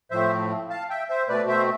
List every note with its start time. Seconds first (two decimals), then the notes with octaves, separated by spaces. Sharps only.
0.11 A2 F3 A3 C4 C5 E5
0.70 F5 A5
0.90 E5 G5
1.09 C5 E5
1.28 B2 A3 C4 B4 D5
1.48 C5 E5